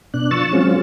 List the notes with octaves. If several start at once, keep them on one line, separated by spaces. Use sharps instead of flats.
B2 D4 F#6
F3 C#6 E6 A6
F#3 G#3 C4 C#4 F4